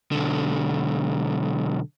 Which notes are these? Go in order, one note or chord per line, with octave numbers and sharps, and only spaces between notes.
B1 D3